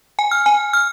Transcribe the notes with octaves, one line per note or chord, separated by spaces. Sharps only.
G#5
F6
G#5
F6